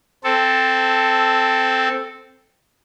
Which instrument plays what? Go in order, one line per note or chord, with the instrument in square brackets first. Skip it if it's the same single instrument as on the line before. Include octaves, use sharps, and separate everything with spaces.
[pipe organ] C4 A4